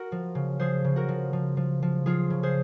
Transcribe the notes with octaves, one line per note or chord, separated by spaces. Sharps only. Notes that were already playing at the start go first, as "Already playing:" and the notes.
Already playing: F#4 A#4
F3
C#3
F3 G#4 C5
C#3
F#4 A#4
F3
F3
F3
F3
F3 F4 G#4
C#3
G#4 C5